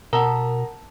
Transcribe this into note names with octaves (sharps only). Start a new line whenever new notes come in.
B2 A4 A#4 F#5 A#5